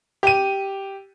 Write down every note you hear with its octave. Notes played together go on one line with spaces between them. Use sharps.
G4 D#7